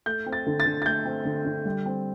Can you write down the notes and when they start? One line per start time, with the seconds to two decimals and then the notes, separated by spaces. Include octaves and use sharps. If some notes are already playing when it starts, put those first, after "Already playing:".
0.06 A3 G6
0.26 C4
0.33 A6
0.46 D3
0.60 A6
0.66 D3
0.82 A6
0.85 A3 G6
1.05 C4
1.25 D3
1.45 D3
1.65 G3
1.86 C4